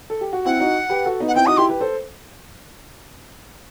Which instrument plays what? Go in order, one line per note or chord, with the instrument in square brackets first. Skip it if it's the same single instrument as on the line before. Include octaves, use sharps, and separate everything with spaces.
[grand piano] A4
G4
F#4
[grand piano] C4 E4 [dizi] F#5
[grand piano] D#4 F#4
G4 B4
F#4 A4
B3 D#4
[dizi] F#5
[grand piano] C4 E4 [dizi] G5
[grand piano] D#4 F#4 [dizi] D#6
[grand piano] E4 G4 [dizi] C6
[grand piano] G4 B4
A4 C5